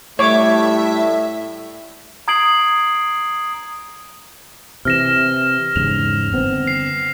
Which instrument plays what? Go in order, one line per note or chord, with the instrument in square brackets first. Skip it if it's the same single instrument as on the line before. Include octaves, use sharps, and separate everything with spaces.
[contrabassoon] A2 [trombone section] G3 A3 [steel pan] C#5 D6 [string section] E5
[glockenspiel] A#5 D#6 G#6 C7 D7 F#7
[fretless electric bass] C3 E3 [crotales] F6 A#6 E7
[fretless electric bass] E2 G#2 C#3 [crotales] F7
[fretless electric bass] G1 B3 C4
[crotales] C7